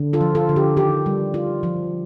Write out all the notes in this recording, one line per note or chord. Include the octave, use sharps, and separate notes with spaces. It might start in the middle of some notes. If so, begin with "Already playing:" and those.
Already playing: D3
F4 A4
F3
F4 A4
D3
G4
D#3 G4
G3
F4
F3